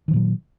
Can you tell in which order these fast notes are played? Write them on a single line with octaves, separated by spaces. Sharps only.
D#3 F3 A#2 F#3